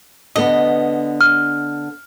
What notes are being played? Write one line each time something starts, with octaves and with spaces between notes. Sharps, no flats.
D3 B3 D#5
F6